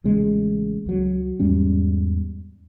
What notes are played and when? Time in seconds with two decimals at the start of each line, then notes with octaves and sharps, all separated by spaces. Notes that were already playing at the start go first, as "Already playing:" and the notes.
0.04 A1 C#3 G#3
0.86 C#2 F#3
1.39 E2 G#2 G3 C#4